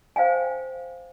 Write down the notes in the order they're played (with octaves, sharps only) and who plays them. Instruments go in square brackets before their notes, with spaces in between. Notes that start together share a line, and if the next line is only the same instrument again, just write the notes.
[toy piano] C5 F5 G5 G#5